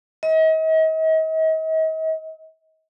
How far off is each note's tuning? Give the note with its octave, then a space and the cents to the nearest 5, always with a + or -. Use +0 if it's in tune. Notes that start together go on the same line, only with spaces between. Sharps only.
D#5 +40